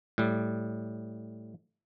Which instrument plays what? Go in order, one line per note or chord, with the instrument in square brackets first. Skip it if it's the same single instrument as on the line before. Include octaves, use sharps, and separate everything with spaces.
[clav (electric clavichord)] A2 G3